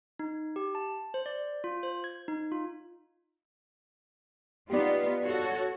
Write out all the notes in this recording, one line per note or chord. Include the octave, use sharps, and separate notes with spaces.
D#4
G4
A5
C5
D5
F4
C5
G#6
D#4
F4
B3 D#4 F4 G4 D5
F#4 A4 C#5